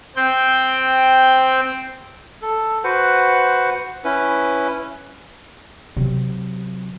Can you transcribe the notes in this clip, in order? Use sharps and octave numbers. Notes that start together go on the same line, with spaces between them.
C4 G5
A4
F#4 B4 C5 F#5
C#4 E4 B4
C3 F#3